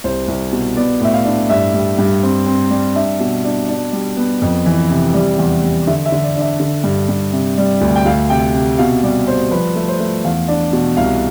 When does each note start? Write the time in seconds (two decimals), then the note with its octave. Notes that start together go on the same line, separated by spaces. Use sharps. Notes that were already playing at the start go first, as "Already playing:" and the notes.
0.04 C2 C5
0.28 C2
0.52 B2
0.76 B3 D5
1.01 A2 E5
1.14 F5
1.25 D4
1.50 G2 E5
1.74 G3
1.99 G2
2.23 C4
2.46 C4
2.71 G3
2.95 D4 E5
3.20 B2
3.44 D4
3.68 D4
3.93 G3
4.17 B3
4.42 F2
4.66 E3
4.90 C3
5.14 G3
5.38 E2
5.63 G3
5.87 D3 E5
6.06 E5
6.12 D3
6.24 D5
6.36 D4
6.41 E5
6.60 D3
6.84 G2
7.09 G2
7.33 C3
7.58 G3
7.81 D2
7.96 G5
8.06 D2 F5
8.30 C3 G5
8.54 C3
8.79 B2 F5
9.03 G3 D5
9.27 G3 C5
9.51 F3 B4
9.76 A3
9.88 C5
10.00 A3
10.24 E2 F5
10.48 D4
10.73 B2
10.97 C2 F5